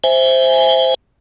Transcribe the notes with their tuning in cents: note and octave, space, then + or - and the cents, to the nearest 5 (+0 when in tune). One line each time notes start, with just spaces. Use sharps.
C5 +0 E5 -5 G#5 +0